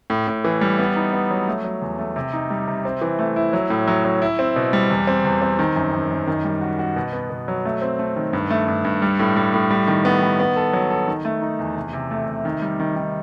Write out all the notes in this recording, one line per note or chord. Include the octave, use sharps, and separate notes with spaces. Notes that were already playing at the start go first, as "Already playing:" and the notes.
A2
A2
E3
G3
B3
D#4
B3
F#3
A3
F#3
E2
A3
C3
D#4
G3
C3
C4
E3
A3
E4
F#3
A2
F#3
F#3
E4
C4
B2
G3
E2
C4
E2
C4
D#3
F#2
F#2
F#2
D#3
G3
F#4
F#4
B2
B3
B2
F#3
A3
C4
A3
D#3
G2
A3
G2
G2
G3
A2
G3
A2
G3
D#3
B3
D#3
B3
A4
F#3
A4
D#3
A3
D#4
E2
C3
C3
A3
C3
D#3
G3
D#3
D#3